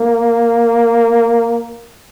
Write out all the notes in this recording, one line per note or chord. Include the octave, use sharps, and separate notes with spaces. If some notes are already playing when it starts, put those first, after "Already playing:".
Already playing: A#3